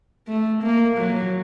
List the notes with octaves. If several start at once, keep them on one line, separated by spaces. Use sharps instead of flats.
A3
A#3
F#3